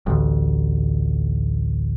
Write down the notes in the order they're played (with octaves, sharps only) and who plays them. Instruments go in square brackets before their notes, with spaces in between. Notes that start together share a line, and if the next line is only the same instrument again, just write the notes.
[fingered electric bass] A1 D2